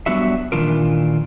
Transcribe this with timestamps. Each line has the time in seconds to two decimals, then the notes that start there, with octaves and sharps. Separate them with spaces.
0.06 F#3 G3 B3 D4 F#4 E5
0.52 A#2 D#3 E3 D4 F4 A#4